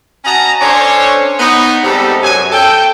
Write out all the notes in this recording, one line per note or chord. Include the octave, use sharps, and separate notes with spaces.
C#4 F#4 D#5 A5 A#5
C#4 D4 A4 C5 C#5
B3 D#4
G#2 C3 G3 B3 D#4 A4
F#2 G#5
A4 G5